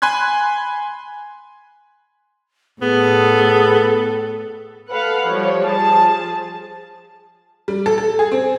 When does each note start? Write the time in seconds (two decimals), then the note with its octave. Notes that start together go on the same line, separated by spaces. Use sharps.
0.02 G#5 B5 C6 F#6 G#6
2.82 A2 B3 G#4 A4
4.91 A4 B4 F5 F#5
5.26 F3 G3 C#5
5.65 F3 G#4 A5
7.68 G3
7.86 A4
7.98 A4
8.19 G#4
8.32 C4